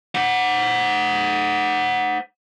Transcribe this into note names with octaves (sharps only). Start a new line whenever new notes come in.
C5 F#5